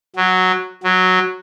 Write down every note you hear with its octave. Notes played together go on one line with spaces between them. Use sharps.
F#3
F#3